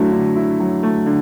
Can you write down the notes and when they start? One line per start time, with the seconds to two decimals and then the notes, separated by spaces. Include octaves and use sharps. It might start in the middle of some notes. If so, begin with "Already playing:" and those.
Already playing: D3 F#3 A3 E4
0.12 D3
0.36 E4
0.60 F#3
0.83 A3
1.06 D3